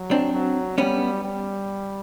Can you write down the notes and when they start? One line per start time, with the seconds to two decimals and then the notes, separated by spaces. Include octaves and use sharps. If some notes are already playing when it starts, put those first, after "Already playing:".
Already playing: F#3
0.11 C4 D4
0.33 F#3
0.78 G3 B3 C#4
1.23 G3